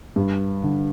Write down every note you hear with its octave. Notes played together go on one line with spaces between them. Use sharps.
G2
D3